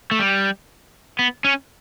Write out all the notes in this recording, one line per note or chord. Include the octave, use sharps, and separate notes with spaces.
A3
G3
B3
C#4